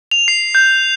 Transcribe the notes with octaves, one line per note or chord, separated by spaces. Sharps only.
F7
C7
G6